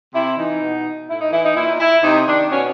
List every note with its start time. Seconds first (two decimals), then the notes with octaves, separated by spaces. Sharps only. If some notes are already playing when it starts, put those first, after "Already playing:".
0.14 C3 E4
0.38 E3 D#4
0.62 B2
1.09 A2 E4
1.21 D#4
1.32 E3 E4
1.44 D#4
1.56 A#2 E4
1.80 E4
2.03 C3 D#4
2.27 D#3 D4
2.51 B2 C#4